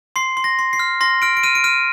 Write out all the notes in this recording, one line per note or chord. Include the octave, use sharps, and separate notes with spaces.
C6 C7
C6
A#6
C6
C7
F6
C6 A#6
F6 D7
D7
F6 D#7
D7
F6 D#7